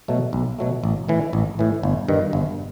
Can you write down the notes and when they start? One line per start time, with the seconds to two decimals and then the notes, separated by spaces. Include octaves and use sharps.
0.08 B2 F#3 A3
0.33 B1
0.59 B2 F#3 A3
0.84 A1
1.09 A2 E3
1.33 A1
1.59 A2 E3
1.83 G1
2.08 G2 D#3
2.33 G1